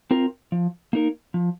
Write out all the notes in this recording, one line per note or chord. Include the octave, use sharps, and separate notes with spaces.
C4 F4 A#4
F3
A#3 D#4 A#4
F3